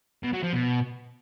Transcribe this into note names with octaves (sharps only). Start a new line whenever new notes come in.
B2
F#3
F3
B2